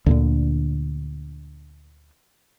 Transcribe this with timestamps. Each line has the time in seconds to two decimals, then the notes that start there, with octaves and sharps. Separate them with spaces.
0.06 D2 A#2 D3